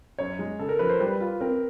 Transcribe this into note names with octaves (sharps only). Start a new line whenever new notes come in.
F#2 C#5
G#3
C#3 A4
A#4
F3 B4
C5
G3 B4
F4
C4 A#4